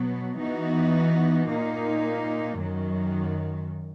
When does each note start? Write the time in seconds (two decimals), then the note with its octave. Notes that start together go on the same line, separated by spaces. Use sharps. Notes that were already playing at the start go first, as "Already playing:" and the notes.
Already playing: B2 F#3 B3
0.39 E3 B3 D#4 F#4
1.48 A#2 A#3 D#4
2.57 F#2 D#3 F#3